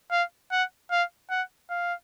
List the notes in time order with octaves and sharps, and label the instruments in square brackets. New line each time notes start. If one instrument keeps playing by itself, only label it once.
[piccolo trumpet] F5
F#5
F5
F#5
F5